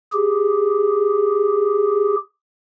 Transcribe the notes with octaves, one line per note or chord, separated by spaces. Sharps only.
G4 G#4